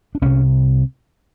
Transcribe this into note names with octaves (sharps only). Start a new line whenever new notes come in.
D4
C2 C3 C#4